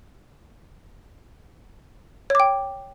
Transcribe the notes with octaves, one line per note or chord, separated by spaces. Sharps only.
C#5 G5 D6